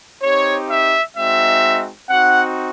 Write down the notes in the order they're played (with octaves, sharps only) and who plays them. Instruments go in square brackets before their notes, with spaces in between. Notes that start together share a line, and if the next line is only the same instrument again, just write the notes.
[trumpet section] C4 D#4 G4 C#5
E5
G#3 C4 D#4 F#4 E5
C4 D#4 F#4 F#5